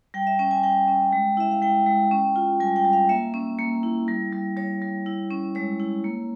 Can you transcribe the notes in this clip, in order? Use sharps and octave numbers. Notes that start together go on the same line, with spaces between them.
G3 G5
E5
C#4 G5
G#5
G3 G5
C#4
G#3
E4 E5
F5
G#3 G5
G#3
C#4
F4
G3 G#5
G5
G3
F5
A#3 E5
C#4
A#3
E4
G3
G3
G3 C#5
G3
E4
C#4
G#3 C#5
E4
A#3